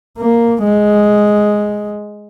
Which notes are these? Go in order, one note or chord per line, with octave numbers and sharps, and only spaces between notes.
A#3
G#3